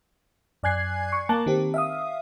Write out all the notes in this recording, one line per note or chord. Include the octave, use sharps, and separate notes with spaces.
F#2 D5 G#5 F#6 G#6 C7
C#6
A#3 A5 A#5 D6 F#6
D#3 C4 G4
E5 F5 D#6